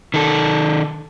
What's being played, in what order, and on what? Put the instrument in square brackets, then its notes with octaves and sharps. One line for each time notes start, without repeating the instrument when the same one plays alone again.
[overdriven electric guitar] D#3 A4